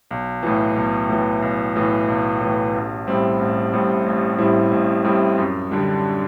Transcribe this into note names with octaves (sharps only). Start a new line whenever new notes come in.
B1
A2 E3
B1
A2 E3
B1
A2 E3
B1
A2 E3
A1
A2 G3 C4 E4
A1
A2 G3 C4 E4
A1
A2 G3 C4 E4
A1
A2 G3 C4 E4
F#2
D3 G3 D4